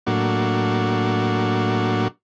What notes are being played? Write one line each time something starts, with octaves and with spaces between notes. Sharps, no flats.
A2 F#3 A#3 D4 F#4